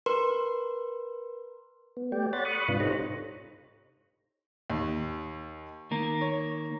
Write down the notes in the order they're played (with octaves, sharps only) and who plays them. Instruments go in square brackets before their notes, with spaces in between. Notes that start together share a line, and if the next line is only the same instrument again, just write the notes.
[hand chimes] A#4 B4 C6
[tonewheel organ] B3
A3 G4 D5 G5
C#5 D5 F#5 B5 C6 A6
B5 C#6 D#6 F#6
G#2 C3 D4 F4 B4
D#4 G4 A4 C5 C#5 A#5
[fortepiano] D#2
[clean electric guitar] D#3 A#3
[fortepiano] C#5